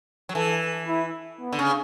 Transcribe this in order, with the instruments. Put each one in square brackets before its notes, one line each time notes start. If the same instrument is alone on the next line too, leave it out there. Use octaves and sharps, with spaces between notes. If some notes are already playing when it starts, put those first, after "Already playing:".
[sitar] F#3
[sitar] E3 [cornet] A4
[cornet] E4
B3
[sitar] D3
C#3